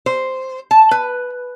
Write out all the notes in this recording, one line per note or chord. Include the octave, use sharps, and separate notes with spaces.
C5
A5
B4